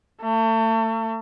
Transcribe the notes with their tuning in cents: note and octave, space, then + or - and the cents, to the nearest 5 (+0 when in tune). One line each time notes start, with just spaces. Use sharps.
A3 +35